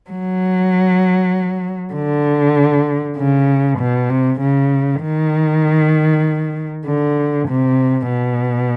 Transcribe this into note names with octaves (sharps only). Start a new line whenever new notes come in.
F#3
D3
C#3
B2
C3
C#3
D#3
D3
C3
B2